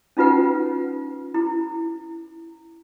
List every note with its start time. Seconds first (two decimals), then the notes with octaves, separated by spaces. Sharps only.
0.17 C#4 D#4 F4 B4 F#5
1.34 E4